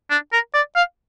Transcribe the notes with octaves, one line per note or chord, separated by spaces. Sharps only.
D4
A#4
D5
F5